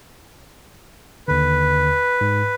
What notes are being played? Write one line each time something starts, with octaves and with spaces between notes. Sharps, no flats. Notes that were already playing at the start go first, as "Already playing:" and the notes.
D#2 D3 B4
G#2